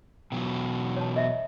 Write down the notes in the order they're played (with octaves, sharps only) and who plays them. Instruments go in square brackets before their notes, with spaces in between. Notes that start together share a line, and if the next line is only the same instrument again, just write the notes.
[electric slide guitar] B2 E3 F#3 [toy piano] G5
[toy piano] C#5 A5
D#5 E5